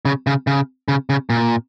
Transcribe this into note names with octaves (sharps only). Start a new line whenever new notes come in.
C#3
C#3
C#3
C#3
C#3
A#2